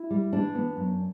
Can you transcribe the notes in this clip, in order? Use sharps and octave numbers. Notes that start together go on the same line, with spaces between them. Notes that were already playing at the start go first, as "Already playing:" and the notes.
Already playing: E4
G3
E3 D4
B3
F#2